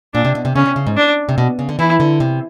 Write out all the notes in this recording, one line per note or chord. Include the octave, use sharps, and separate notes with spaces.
A#2 D4
C3
B2
C3
C#3 C#4
C3
C#3
G#2
D4
C3
B2
C#3
D3
E3 E4
D3
C3